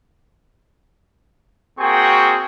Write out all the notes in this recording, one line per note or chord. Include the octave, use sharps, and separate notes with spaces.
A#3 C4 F#4 G#4 G5 C#6